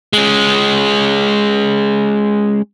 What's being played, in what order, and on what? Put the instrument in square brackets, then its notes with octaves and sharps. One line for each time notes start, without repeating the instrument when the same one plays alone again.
[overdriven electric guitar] G#3 C#4